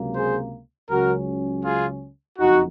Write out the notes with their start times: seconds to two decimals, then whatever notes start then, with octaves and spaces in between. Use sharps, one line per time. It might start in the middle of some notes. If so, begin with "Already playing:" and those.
Already playing: C#2 C3 F#3 A#3
0.14 G#4 C5
0.90 C#2 C#3 F#3 C#4 F#4 A#4
1.64 F4 G#4
2.39 F#1 F2 D#4 F#4